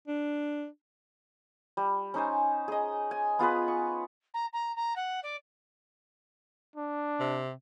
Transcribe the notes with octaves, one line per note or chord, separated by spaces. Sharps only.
D4
G3
C#4 D#4 C5 G#5
G#4 D#5
G#5
B3 F4 G#4 B4
C#6
A#5
A#5
A#5
F#5
D5
D4
C3